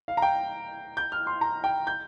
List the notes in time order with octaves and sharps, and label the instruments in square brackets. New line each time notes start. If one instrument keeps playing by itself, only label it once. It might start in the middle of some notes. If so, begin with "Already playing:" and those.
[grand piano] F5
A#5
G5
G6
F6
C6
A#5
G5
G6